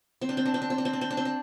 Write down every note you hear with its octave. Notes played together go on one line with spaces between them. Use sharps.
C4
D4
C4
D4
C4
D4
C4
D4
C4
D4
C4
D4
C4
D4